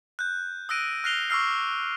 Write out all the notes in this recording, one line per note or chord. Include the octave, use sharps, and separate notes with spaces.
F#6 G6
D#6 E6 F#6 A#6 D7 D#7
F6 F#6 A#6 C7 F7 G7
C#6 D6 E6 F6 C7